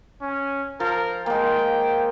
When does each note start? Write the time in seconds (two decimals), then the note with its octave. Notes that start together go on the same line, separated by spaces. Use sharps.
0.22 C#4
0.80 F3 A#4
1.26 G#3 A#3 G5